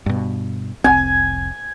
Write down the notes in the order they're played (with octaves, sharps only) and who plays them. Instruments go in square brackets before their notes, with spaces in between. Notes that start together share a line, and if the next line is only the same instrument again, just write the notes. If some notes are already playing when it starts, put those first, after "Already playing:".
[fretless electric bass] G2 B2
[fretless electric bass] F1 C2 C4 [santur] G#5